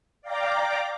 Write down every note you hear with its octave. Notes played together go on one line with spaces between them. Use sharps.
D5 F5 G5 A#5 D6